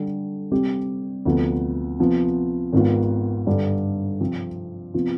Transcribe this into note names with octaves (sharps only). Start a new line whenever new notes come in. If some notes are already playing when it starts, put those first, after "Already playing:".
Already playing: D3 G3 D4
C3 G3 C4 G4
D2 C3 F3 B3
C3 F3 B3
G#1 G#2 D#3 B3 F4
G2 D3 G3
C3 F3 C4 F4
C3 F3 B3 F4